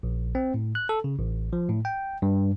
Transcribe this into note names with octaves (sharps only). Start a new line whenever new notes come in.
A#1
C4
A2
F#6
A4
C#3
A1
F3
A2
G5
G2